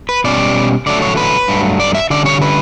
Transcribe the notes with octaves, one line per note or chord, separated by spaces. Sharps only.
B4
B2 G3 C#4 D5
D3 F#3 A3 D5
C#5
B4
G2 F#3 A3
D5
E5
D3 G3 C#4 D5
C#5
B4